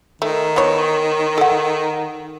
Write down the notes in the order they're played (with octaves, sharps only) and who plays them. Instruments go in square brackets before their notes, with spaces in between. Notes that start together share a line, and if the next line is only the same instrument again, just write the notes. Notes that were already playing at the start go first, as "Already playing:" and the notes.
[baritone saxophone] D#3 [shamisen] A3
[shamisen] E3 B3 C#5
A4 F#5